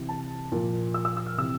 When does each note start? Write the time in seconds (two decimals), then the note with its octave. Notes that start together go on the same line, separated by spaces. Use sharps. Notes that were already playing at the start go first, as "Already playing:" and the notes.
Already playing: C3 E3
0.09 A5
0.52 A#2 F3
0.94 E6
1.05 E6
1.17 E6
1.26 F6
1.38 C3 E3 E6